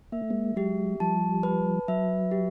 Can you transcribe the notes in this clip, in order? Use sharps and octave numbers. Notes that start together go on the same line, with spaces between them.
A#3 E5
A3
G#3 A#3
F#3 G#3 G4
F3 G3 A5
B4
F#3 E5
G4